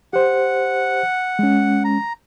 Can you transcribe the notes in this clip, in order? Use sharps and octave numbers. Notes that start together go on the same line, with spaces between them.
G4 C5 F#5
G#3 C#4
A#5